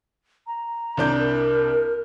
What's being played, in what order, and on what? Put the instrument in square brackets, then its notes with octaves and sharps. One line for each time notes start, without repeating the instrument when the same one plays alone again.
[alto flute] A#5
[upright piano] C2 D4 G6
[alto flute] A#4